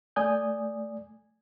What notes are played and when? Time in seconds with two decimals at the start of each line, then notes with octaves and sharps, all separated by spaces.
0.16 A3 D5 G#5 D#6 G6